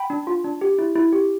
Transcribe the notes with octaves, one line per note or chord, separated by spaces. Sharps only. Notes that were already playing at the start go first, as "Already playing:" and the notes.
Already playing: G5 B5
D4
F4
D4
G4
E4
E4
G4